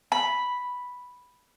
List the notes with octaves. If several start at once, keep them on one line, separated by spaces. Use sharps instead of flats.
B5